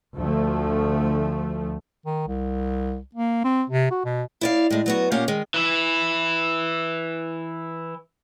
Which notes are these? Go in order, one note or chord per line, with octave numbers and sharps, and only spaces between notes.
D2 F3 A3
D#3
C2
A#3
C4
C3
F#4
B2
E4 D5 F5
A2 G#3
F#3 B3 F#4
A#2 A#3 C#4 G4 F5 F#5
D#3 G#3
E3 E4